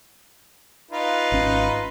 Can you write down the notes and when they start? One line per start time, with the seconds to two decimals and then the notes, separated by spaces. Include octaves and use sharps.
0.91 D#4 F4 B4
1.32 G#1 C#4